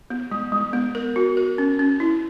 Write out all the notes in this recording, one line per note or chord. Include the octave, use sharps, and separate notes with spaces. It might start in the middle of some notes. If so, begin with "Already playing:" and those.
B3
G#3
G#3
B3
A#4
F#4
A#4
C#4
C#4
E4